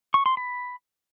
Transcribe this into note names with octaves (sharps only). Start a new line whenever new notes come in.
C#6
C6
B5